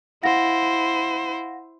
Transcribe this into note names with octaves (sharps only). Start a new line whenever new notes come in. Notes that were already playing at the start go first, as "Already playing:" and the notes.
E4 C5 F5 F#5 A#6